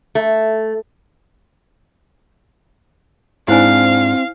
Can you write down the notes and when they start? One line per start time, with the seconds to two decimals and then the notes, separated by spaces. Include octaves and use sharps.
0.15 A3
3.48 G#2 C4 D4 E4 C5 F5 G#5